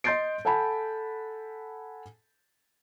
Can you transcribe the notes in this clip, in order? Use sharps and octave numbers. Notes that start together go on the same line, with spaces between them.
D#5 C6 G6 A6 C7 D7
A4 F#5 G#5 A5 B5